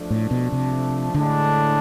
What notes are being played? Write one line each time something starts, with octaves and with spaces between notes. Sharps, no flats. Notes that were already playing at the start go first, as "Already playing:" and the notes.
Already playing: F3 A3 D4
A2
B2
C3
A2 D3 G#3 D4